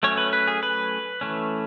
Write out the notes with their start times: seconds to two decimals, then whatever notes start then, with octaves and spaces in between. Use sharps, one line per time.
0.03 F#3 A3 C#4 C#5
0.18 B4
0.33 B4
0.47 G#4
0.63 B4
1.21 E3 A3 C#4